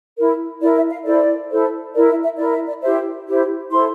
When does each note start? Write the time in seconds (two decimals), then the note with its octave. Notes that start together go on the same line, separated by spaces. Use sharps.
0.17 E4 A#4
0.61 E4 A#4 D5
0.76 E5
0.90 F5
1.05 E4 A4 C5 D5
1.50 E4 A4 C5
1.94 A#4 D5
1.97 E4
2.09 E5
2.24 E5
2.38 E4 A#4 D5
2.53 E5
2.68 D5
2.82 E4 G4 C5 E5
3.27 E4 G4 C5
3.71 E4 A4 C5 C6